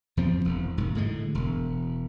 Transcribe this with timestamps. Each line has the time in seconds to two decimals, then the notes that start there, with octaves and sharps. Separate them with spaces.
0.17 E2 F3 C4
0.45 E1
0.77 E1 G#2
0.95 A2 D3 G#3
1.35 E1